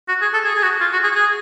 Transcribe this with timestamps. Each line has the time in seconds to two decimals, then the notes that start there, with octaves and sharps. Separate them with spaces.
0.09 F#4
0.22 G#4
0.34 A4
0.45 G#4
0.55 G#4
0.63 F#4
0.81 F4
0.93 F#4
1.04 G#4
1.15 G#4